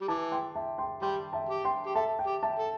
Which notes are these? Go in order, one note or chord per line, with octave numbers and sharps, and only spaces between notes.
G3
E3 A5 D6
G5 C6
E5 A5
G5 C6
G3 G5 C6
E5 A5
G4
G5 C6
G4
A4 E5 A5
G5
G4
E5 A5
A4